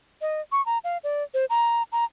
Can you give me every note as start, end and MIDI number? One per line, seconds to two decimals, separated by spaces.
0.21 0.41 75
0.52 0.64 85
0.66 0.78 82
0.84 0.98 77
1.04 1.23 74
1.34 1.45 72
1.50 1.83 82
1.92 2.05 82